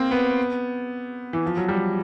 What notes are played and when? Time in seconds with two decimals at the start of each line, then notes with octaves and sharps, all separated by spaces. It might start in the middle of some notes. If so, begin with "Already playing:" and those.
Already playing: A#3 C4
0.11 B3
1.33 E3
1.46 F3
1.57 F#3
1.68 G3